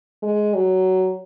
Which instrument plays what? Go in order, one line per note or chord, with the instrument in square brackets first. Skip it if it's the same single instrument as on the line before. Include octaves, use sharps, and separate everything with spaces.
[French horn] G#3
F#3